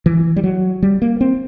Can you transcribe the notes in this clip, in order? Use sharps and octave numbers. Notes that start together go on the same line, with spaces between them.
E3
G3
F#3
G3
A#3
C4